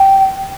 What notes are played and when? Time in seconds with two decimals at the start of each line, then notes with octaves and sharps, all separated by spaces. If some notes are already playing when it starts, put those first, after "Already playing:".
Already playing: G5